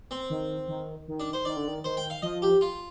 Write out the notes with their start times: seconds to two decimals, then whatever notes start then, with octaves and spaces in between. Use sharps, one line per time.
0.11 C4
0.30 D#3
0.68 D#3
1.08 D#3
1.20 D4
1.33 C5
1.45 D#3 D5
1.57 D3
1.68 D#3
1.84 D#3 C5
1.97 G5
2.10 F5
2.22 F3 D#5
2.42 G4
2.61 F4